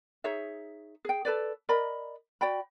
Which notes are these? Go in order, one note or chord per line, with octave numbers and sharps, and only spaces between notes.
D#4 G#4 C#5 E5
G#4 G5
A4 B4 D5
A#4 D5 D#5 B5
F#4 D5 G5 B5